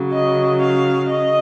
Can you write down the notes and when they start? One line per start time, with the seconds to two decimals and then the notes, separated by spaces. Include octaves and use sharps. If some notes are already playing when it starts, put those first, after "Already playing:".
Already playing: C#3 F#3
0.13 D#5
0.62 F5
1.10 D#5